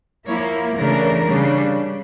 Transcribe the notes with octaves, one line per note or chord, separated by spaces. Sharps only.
F3 A#3 E4 C#5
C#3 E3 A3 D4 A#4
C#3 G3 D4